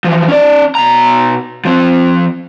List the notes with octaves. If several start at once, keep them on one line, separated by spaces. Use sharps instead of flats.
E3 F3
C#4 D5
B2 A#5
F3 C4